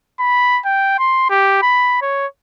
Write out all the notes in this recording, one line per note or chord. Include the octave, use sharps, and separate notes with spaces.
B5
G5
C6
G4
B5
C#5